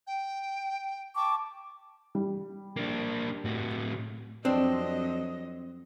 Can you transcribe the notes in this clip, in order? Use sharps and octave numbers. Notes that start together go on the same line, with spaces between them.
G5
G5 A5 C#6 D6
G3
A#3 D4
A2 F#4
F2 F#3 C4 D4 D#5